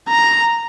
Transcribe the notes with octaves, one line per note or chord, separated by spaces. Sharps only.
A#5